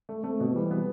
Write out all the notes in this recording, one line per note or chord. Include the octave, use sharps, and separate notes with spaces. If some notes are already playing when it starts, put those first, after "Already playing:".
A3
A3 C4
B2
E3 G3
B3